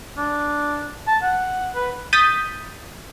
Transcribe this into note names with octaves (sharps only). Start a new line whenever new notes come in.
D4
A5
F#5
B4
D#6 G6 A6 B6 D#7